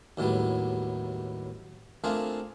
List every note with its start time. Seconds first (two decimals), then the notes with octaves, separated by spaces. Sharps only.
0.17 D#2 A2 F#3 G3 B3
2.04 A3 A#3 C4 D4 F4 G#4